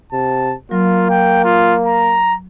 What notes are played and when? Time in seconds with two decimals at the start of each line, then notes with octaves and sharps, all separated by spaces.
0.12 C3 A5
0.71 F#3 A#3 F4
1.10 G5
1.44 F4
1.86 A#5